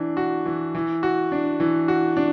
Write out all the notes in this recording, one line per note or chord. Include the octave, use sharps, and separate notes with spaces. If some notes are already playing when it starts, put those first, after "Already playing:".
Already playing: E3 D4
F#4
E3
E3
F#4
D4
E3
F#4
D4